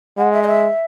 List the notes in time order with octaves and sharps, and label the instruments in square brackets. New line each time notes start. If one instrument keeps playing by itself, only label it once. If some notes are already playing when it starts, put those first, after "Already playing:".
[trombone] G#3 [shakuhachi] F#5
[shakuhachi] E5
D#5
E5